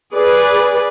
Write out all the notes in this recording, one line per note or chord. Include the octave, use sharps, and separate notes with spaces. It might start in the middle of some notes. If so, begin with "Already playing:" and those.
G#4 B4 D5